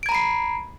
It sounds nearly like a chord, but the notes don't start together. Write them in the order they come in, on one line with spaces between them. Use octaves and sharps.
D7 G#6 A#5 B5 C7